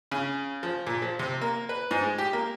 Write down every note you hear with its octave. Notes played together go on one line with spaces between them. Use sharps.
C#3
F3
A#2
F3
C3
A#3
B4
G#2
G#3
G4
A#3